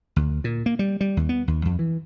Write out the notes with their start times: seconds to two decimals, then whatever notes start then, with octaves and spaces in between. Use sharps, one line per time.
0.16 D2
0.44 A#2
0.66 A#3
0.79 G3
1.01 G3
1.17 D#2
1.29 B3
1.48 D#2
1.65 F2
1.79 E3